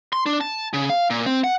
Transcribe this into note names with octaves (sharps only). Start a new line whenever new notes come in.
C6
D4
A5
C#3
F5
A#2
C4
F#5